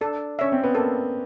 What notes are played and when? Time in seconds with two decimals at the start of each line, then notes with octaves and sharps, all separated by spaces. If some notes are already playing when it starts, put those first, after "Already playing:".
0.01 D4 A4
0.39 C#4 C#5 E5
0.52 C4
0.64 B3
0.75 A#3 A4